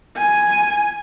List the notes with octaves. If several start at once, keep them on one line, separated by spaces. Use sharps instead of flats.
G#5